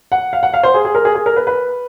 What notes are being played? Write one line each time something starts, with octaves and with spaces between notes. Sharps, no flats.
F#5
F5
F#5
F5
C5
G#4
G#4
A#4
G#4
G#4
A#4
B4
B4